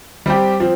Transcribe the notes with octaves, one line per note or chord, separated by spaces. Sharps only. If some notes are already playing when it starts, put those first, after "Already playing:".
G3 C4 G4
F3 C4